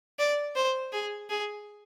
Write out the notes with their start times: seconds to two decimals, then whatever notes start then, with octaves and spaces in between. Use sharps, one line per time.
0.19 D5
0.56 C5
0.93 G#4
1.30 G#4